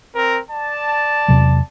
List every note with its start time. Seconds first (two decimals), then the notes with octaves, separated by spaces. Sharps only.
0.15 C4 A#4
0.50 D5 A5
1.28 E2 C3 F#3